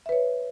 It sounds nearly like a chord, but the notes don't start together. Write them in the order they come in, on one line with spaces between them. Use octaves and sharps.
E5 B4 C#5